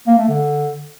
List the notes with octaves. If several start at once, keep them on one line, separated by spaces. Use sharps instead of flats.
A#3
A3
D3